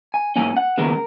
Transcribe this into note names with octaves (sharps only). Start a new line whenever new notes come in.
G#5
G#2 F#3 A#3 C#4 G#5
F#5
D#2 C#3 G#3 B3 A#4